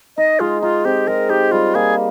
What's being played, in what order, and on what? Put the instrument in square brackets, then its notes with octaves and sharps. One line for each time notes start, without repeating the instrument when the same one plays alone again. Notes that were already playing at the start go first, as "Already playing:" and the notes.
[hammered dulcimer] D#4 [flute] D#5
[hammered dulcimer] G#3 [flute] F4
[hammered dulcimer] D#4 [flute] F4
[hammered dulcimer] C4 [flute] G4
[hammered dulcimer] G#3 [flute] A#4
[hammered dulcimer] D#4 [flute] G4
[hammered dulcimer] G3 [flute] F4
[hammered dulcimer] A#3 [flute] G#4